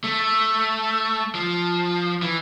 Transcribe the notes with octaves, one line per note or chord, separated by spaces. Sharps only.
A3
F3
E3